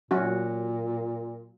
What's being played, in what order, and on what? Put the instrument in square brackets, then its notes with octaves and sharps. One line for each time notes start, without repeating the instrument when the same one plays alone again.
[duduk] A#2 [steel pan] F#3 C#4 F#4